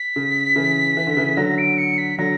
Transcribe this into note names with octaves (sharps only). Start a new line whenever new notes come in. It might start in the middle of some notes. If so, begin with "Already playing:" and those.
Already playing: B6
C#3
C#3 E3
E3
D3
C#3 E3
D3 F#3 A#6
D7
C#7
B6
D3 F#3 A#6